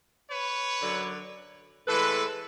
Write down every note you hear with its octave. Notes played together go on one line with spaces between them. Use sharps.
B4 C#5
F#2 D3 F#3
A2 E3 G#3 A4 B4